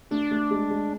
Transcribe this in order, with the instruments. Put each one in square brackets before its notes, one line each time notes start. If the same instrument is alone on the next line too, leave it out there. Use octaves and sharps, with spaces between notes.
[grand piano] A3 [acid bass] D4
[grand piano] A3
G#3
G#3